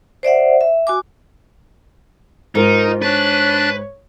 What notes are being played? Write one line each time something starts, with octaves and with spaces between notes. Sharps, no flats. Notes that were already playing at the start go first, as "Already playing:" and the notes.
C5 D5 E5 F#5
E5
F#4 G#5 D6
G#2 D#4 F4 A#4
D4 B4 C#5 F#6 A6